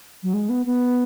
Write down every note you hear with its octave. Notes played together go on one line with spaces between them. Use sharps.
F#3
G#3
B3
B3